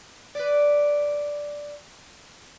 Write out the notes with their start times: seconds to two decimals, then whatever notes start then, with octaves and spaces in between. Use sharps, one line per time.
0.35 B4 D5